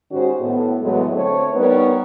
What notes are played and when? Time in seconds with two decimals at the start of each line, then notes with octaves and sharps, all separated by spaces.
0.11 G#2 D#3 C#4 F#4 G4 C5
0.40 A2 B3
0.82 E2 A2 F#3 G#3 A3 B3
1.13 D3 A3 C4 C#5
1.54 G3 B3 D#4 A#4 B4 C#5